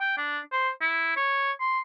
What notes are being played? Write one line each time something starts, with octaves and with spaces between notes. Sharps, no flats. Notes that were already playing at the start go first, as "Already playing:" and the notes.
G5
D4
C5
E4
C#5
C6